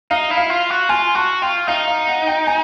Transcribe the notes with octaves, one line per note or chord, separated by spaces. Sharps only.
D#4 F5
E4
F5
F4
F#4
F4 G#5
F#4 A5
F4 G5
D#4 F5
F5
F#5
G5
G#5